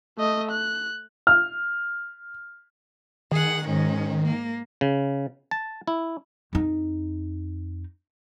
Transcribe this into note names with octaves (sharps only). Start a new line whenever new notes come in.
A3 D#5
F#6
F6
D#3 G#4 F#5
G#2 C#4
A#3
C#3
A5
E4
F2 D#4